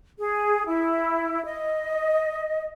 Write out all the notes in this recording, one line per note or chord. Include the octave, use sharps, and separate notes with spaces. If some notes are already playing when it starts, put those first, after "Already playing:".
G#4
E4
D#5